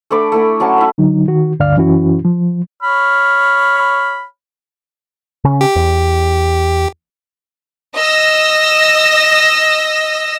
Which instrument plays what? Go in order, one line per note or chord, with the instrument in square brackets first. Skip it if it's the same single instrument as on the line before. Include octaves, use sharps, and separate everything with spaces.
[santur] A3 D4 B5 D6
A3 E4 B5
F#3 C#4 A5
E4 B5
[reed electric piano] D3 F#3 D#4
D#3 F#4
D2 G2 D3 D5 F5 F6
F#2 E3 C#4 E4 F#4
F3
[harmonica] C#5 B5 F6
[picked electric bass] C#3 C#4
[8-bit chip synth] G4
[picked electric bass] E2
[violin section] D#5 E6 A#6